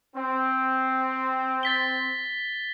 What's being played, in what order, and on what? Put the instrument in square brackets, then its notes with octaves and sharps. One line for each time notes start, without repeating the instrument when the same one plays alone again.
[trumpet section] C4
[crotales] A6 B6 G7